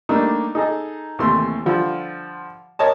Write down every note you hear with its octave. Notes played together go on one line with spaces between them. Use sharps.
G3 A3 A#3 D4 D#4
D#4 G#4 A4 D#5
D#2 C3 E3 A3 C6
D3 F3 G3 F4
A#4 C#5 D#5 A5